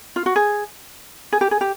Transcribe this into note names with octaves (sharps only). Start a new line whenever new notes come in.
F4
F#4
G#4
G#4
G4
G#4
G4